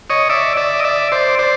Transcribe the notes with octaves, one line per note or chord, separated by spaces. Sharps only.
C#5 D#5
D5 E5
D5 E5
D#5
D5 E5
C5 D5
C5 D5